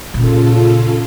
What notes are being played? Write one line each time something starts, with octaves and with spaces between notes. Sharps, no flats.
A#2 C#3 F4 A4